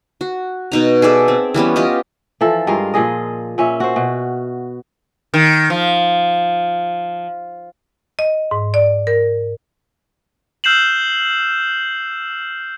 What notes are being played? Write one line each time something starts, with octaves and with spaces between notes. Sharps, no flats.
F#4
B2 D#4 A#5
G#4 A4 D5 E5
C4
E3 G3 B3 C#4
F4 G4 D#5
E3 F3 A4
G2 G#3 F4 A#4
A#2 F3 G#4 D#5
A#2 C#4 E5
F#4 C5
B2
D#3
F3
D#5
G#2
D5
A#4
E6 F6 G6 C7 E7 F#7